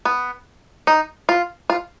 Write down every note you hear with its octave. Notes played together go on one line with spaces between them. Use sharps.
B3
D#4
F4
F4